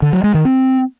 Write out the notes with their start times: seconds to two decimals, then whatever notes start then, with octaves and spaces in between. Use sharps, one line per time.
0.02 D3
0.13 F#3
0.24 G#3
0.34 D#3
0.45 C4